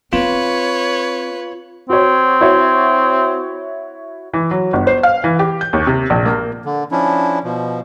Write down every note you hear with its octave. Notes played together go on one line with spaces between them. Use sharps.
C4 F4 B4 C#5
C4 F#4 C#5
E4 F#4 C#5
E3
F#3
G1
C5
F5
E3
G4
G6
D#2
C3
A#1
A#3
D3
F3 C#4 D4 E4
B2 F3